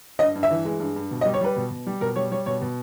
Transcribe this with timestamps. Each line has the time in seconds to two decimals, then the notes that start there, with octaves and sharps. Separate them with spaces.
0.19 G2 D#5
0.35 G2
0.43 E5
0.50 E3
0.65 G#3
0.80 G2
0.96 G2
1.11 B2
1.21 D#5
1.25 G3
1.34 C#5
1.41 G3 B4
1.56 B2
1.71 B2
1.87 G3
2.01 B2 A#4
2.16 G3 C#5
2.32 G3 C#5
2.46 B2 C#5
2.61 B2